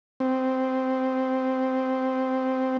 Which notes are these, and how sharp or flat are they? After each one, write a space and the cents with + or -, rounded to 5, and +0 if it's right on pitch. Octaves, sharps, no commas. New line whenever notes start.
C4 -5